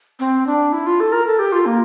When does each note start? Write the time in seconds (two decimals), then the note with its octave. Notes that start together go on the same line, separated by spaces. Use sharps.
0.20 C4
0.47 D4
0.72 E4
0.86 F4
1.00 A4
1.12 A#4
1.26 A4
1.39 G4
1.52 F4
1.66 A#3